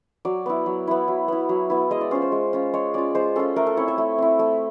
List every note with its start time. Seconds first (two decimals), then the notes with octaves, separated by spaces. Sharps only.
0.25 F#3 D5
0.46 B3 E4
0.66 F#3
0.87 B3 E4
1.08 F#3
1.28 B3 E4
1.49 F#3
1.70 B3 E4
1.91 G#3 D#5
2.01 D5
2.11 C#4 F4 C5
2.22 C5
2.32 G#3
2.53 C#4 F4
2.73 G#3 C#5
2.94 C#4 F4 D5
3.15 G#3 C5
3.36 C#4 F4 A4
3.56 A3 A#4
3.67 A4
3.77 C4 E4 C#5
3.88 E5
3.98 A3
4.18 C4 E4
4.39 A3